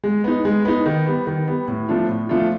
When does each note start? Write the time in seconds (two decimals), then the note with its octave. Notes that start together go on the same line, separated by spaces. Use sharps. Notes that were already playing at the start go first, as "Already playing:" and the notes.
0.04 G#3
0.24 B3 D#4
0.45 G#3
0.65 B3 D#4
0.86 D#3
1.06 G3 B3
1.27 D#3
1.47 G3 B3
1.68 A2
1.88 F3 A3 D4 F4
2.09 A2
2.29 F3 A3 D4 F4